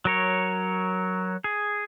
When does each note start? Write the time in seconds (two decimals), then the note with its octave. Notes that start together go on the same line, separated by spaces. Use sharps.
0.05 F#3 A#4 C#5
1.44 G#4